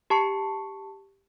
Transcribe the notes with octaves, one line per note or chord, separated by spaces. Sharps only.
G4 A5 C#6 C7 C#7